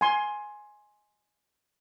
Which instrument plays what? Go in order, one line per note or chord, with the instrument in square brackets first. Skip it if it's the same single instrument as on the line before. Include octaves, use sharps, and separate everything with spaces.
[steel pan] G#5 C6